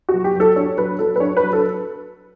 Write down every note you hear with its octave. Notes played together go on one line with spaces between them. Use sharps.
F#4
F#3
G4
F#3 A4
D4 C#5
F#3 B4
F#3 A4
B4
D4 C#5
B4
F#3
A4